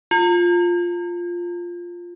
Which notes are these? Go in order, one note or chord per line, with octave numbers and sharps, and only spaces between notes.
F4